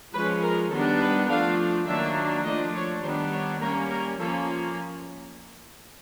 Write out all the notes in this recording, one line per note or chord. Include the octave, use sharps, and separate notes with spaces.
F3 G#3 C#4 B4
A#4
D#3 G3 B3 D4 A4
B4
F3 A3 D4 F5
D#3 F#3 A#3 D4 E5
F3 A3 D4 D#5
C#5
D#3 G3 B3 D4 C5
C#5
G3 A#3 C#4 A#4
A#4
F3 A#3 C#4 A4